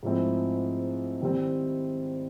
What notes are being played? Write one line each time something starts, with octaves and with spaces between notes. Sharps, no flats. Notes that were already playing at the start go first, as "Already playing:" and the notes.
G#2 F3 A3 C4 E4
D#3 G3 C4 E4